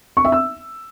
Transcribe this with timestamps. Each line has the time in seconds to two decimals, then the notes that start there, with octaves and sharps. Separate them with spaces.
0.17 C#6
0.25 E5
0.32 E6